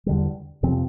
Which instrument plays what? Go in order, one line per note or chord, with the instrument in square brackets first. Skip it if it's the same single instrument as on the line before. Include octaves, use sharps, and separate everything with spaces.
[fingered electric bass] E2 D3 G3
F2 C3 F3 C4